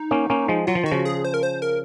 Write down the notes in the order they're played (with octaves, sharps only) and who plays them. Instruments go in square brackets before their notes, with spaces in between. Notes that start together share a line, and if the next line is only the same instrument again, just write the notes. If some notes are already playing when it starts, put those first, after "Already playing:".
Already playing: [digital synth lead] D#4
[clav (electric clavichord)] A#3 C#4
A#3 C#4
F3 G#3
[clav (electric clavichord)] F#3 [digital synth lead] F4
[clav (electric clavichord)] F3
[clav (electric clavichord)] D#3 [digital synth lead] F#4
[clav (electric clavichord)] C#3 F3
[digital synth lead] G#4
C5
A#4
C5
A#4